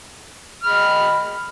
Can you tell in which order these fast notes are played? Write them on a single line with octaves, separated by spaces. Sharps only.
F6 B5 D#5